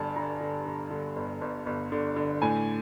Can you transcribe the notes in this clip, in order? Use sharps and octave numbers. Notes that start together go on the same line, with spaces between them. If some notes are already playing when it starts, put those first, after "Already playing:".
Already playing: G1 G2 D3 G#5 A5
D3 A#5
D3
D3
D3
G1
G1
G1
D3
D3
A2 G#5